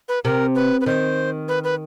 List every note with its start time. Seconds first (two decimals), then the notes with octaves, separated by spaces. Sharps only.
0.09 B4
0.24 C3 A#4
0.55 B4
0.81 B4
0.86 D#3 C5
1.48 B4
1.64 B4